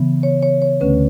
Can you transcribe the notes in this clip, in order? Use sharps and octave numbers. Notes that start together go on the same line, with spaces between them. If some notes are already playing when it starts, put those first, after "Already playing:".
Already playing: C#3 E3 B3
C#5
C#5
C#5
D2 D3 A3 C#4 B4